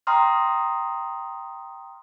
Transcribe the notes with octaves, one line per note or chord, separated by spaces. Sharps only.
G5 A#5 C6 D#6 F6